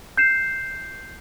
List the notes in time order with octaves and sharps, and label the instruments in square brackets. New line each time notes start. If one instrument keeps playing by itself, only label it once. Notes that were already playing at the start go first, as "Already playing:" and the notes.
[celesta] G6 C7 E7